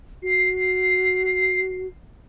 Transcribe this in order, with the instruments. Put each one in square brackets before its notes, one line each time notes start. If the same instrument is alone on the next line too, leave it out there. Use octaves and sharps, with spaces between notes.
[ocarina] F#4 [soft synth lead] C7